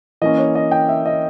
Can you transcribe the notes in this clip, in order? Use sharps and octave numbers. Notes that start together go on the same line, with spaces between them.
E3 A#3 C#4 D#5
C#5
D#5
G5
E5
D#5